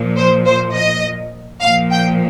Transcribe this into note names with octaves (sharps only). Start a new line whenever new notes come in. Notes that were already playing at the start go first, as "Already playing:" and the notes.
Already playing: A#2 F3
C5
C5
D#5
A#2 F3 F5
G5